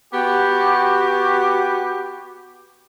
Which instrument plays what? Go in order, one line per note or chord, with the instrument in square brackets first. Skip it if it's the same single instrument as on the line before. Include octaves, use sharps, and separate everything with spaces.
[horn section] B3 F#4 G4